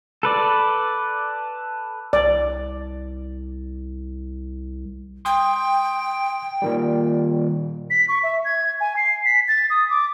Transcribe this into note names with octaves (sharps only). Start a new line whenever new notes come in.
A4 B4 D5
C2 D5
G5 C6 D#6
A#2 D#3 G3
B6
C#6
E5
G#6
G#5
C7
B6
A6
D#6
D6